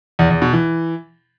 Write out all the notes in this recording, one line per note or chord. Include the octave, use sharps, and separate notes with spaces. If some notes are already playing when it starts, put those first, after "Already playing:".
E2
E2
B2
E3